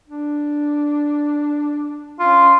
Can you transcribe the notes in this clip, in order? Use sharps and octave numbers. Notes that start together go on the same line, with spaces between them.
D4
C#4 F4